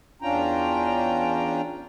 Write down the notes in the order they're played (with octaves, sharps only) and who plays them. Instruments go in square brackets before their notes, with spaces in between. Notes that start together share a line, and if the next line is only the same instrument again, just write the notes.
[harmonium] E2 C#4 D4 F4 G5 A#5